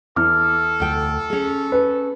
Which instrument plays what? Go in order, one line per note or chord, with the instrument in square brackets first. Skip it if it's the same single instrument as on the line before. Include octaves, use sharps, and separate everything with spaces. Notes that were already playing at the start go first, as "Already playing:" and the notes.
[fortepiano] E2 [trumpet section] A4 [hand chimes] D6 F6
[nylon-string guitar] D2 G5
C#4 G#4
[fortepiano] B4